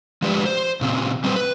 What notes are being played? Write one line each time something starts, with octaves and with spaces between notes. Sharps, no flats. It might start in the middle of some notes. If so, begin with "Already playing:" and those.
F3 G#3 G4 B4 D5
C5
A#2 C#3 C4
G3 C4 D#4 G#4 B4 C5
B4